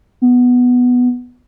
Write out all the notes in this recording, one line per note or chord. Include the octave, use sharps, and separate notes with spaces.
B3